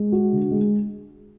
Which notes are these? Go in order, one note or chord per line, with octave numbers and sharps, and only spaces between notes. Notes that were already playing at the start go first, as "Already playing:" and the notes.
Already playing: G#3
F#4
D3
G#3